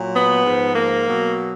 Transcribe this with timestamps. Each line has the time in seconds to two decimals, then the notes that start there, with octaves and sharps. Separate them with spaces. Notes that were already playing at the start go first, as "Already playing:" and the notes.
Already playing: A#2 F#3
0.15 B3
0.45 G#2 F3
0.75 A#3
1.06 B2 F#3